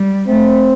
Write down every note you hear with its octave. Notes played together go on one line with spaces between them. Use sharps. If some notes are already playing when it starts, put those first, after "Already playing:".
Already playing: G3
A3 C4